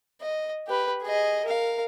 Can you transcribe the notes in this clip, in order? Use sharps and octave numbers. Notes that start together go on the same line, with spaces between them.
D#5
G4 B4
G#4 D#5
A#4 F5